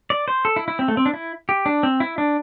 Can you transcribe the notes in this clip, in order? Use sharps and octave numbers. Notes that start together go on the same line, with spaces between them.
D5
C5
A4
E4
E4
C4
A3
C4
D4
E4
G4
D4
C4
E4
D4